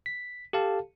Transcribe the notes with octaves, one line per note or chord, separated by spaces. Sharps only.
B6
G4 A4 F5 A5